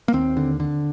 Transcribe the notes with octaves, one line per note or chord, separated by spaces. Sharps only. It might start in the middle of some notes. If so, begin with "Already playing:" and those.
A#3
D#2 C4
D3
D3